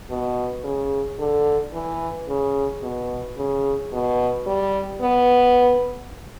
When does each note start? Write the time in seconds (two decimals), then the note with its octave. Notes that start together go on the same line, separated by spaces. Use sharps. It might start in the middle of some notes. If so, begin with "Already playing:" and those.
0.10 B2
0.64 C#3
1.19 D3
1.73 E3
2.28 C#3
2.83 B2
3.37 C#3
3.92 B2
4.47 G3
5.01 B3